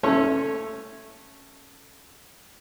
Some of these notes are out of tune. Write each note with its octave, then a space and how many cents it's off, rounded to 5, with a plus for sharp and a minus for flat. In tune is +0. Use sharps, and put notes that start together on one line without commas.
A3 +0 C#4 -10 C#5 -10